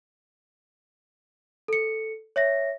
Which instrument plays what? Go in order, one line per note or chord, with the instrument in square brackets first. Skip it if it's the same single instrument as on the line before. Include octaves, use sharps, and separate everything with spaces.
[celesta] A4 C#7
C#5 E5 A#6